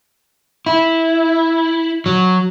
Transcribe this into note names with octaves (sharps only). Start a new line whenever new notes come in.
E4
F#3